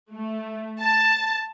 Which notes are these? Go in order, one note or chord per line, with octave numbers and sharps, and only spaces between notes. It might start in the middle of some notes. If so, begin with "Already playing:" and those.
A3
A5